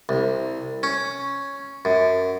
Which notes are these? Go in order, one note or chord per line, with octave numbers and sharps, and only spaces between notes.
C2
C#4
F#2